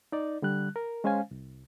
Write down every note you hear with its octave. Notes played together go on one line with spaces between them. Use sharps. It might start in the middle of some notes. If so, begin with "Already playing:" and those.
D#4 D5
D3 G3 F#6
A#4
G#3 C#4 C5 F5 G#5
C2